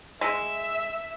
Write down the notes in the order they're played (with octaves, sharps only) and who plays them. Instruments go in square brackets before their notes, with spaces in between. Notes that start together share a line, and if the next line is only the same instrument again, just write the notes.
[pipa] G#3 [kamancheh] E5 [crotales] E6 B6